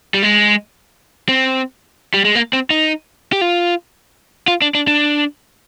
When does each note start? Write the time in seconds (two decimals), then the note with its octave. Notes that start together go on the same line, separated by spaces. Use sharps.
0.14 G3
0.22 G#3
1.29 C4
2.14 G3
2.25 G#3
2.35 A#3
2.53 C4
2.70 D#4
3.32 G4
3.41 F4
4.48 F4
4.62 D4
4.75 D4
4.87 D4